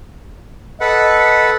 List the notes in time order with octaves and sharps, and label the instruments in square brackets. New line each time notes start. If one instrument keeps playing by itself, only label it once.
[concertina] A4 B4 F#5 [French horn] D#5